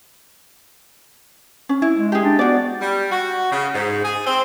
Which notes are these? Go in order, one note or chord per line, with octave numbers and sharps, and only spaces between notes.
C#4
E4
G#3
G4 G#4
D4
B3 F#4 D5
G3
F#4
C#3
G#2
G#4
C4